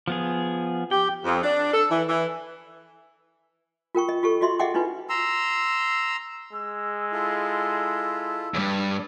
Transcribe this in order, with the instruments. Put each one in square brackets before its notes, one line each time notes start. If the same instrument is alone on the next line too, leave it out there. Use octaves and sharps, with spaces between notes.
[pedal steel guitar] F3 B3 G#4
[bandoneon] G4 [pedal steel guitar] G5
[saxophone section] F2
D4
A4
E3
E3
[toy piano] F4 A#4 G5 C#6
D#5
F4 G4 A4 C#6
F4 F#4 D#5 E5 C6
G#4 D#5 E5 F#5 G5 D6
D4 E4 F4 B4
[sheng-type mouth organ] A#5 C6 E6
[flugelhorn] G#3 [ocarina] E6
[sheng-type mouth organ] E4 F4 A4
[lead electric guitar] E2 G2 [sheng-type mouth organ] B4